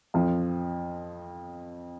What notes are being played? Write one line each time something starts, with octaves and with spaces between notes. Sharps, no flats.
F2 F3